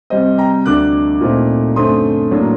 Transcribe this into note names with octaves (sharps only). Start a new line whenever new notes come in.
C3 G3 C4 C5 D#5
G5 A#5
D2 D3 A3 D4 D6 F#6
A#2 A3 C4 D#4
F#2 D3 A3 C4 C6 D#6
A2 F#3 A#3 D4